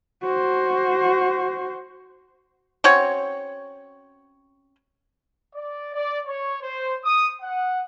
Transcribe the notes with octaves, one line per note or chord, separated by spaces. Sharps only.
F#4 C5
C4 C#4 F#4 C#5
D5
D5
C#5
C5
D#6
F#5